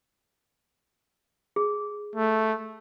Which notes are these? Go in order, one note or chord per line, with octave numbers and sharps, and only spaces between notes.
G#4
A3